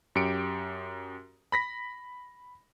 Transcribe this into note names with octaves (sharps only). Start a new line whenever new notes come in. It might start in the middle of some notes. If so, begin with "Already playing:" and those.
F#2 G4 C#7 D7
B5 A#6 B6